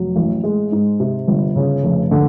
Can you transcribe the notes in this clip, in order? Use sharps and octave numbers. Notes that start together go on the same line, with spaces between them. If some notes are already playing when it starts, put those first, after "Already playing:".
Already playing: F1 F#3
A1
G#3
G#2
C3
G1
C#3
F1
D3